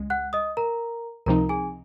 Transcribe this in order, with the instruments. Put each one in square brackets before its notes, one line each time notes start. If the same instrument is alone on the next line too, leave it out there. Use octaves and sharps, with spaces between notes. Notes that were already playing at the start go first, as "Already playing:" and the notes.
Already playing: [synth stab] C#2 G#3
[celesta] F#5 F#6
D#5 D#6
A#4 A#5
[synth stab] C#2 C3 F3 C4 D#4 [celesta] A#4 A#5
[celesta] G#4 G#5